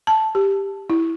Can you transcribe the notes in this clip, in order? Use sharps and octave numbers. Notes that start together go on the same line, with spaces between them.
A5
G4
E4